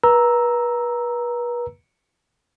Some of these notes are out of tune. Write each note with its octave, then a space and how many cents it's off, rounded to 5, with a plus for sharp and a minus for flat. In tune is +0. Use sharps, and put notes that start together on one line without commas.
B4 -35 A#5 +0 E6 -5